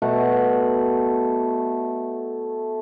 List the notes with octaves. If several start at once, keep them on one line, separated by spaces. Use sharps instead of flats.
B2 A3 F#5